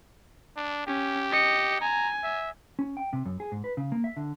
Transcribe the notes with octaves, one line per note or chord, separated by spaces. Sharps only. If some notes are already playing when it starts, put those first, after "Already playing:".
D4
C#4 G4
D#5 C#7
G#5 A#5
E5
C#4
G5
C3
F#2
G#4
G#2
B4
C#3
A#3
E5
D3